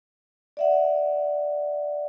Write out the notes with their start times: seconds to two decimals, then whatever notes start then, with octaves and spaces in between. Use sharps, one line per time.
0.57 D5 E5 F#5